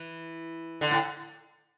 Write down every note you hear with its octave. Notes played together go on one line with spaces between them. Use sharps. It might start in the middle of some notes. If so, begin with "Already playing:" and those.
Already playing: E3
D3
A2